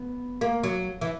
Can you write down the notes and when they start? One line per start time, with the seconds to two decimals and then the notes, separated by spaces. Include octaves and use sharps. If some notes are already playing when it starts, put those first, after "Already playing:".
Already playing: B3
0.41 A#3
0.63 F#3
1.01 E3